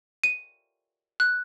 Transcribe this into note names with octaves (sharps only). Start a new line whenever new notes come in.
D#7
F#6